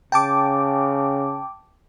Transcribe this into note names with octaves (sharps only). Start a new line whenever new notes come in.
C#3 G5 A5 D6